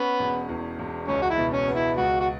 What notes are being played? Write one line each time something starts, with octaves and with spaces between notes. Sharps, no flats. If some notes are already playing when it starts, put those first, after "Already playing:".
Already playing: B3 C#4
E1
E2
E1
C#2 C#4
F#4
E4
B2
C#4
B3
E4
C#2 F#4
F#4